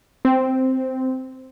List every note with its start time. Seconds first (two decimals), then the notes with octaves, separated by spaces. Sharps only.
0.25 C4